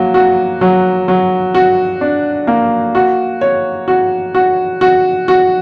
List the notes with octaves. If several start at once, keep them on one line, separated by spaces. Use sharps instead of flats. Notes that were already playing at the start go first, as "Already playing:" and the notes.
Already playing: F#3 A#3
F#4
F#3
F#3
F#4
D4
A#3
F#4
C#5
F#4
F#4
F#4
F#4